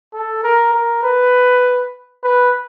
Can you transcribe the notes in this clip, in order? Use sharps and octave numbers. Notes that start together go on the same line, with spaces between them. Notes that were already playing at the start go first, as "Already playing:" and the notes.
A4
A#4
A#4
B4
B4